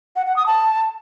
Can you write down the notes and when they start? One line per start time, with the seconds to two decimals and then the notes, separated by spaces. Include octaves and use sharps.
0.16 F#5
0.26 F#5
0.36 D#6
0.47 A5